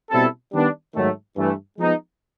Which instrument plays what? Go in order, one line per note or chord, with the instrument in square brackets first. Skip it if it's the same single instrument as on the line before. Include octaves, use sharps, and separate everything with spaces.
[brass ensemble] B2 G3 C4 E4 A4
D#3 G3 B3 D4
G#2 D#3 F#3 A3
G2 E3 A3
F3 G#3 B3 D#4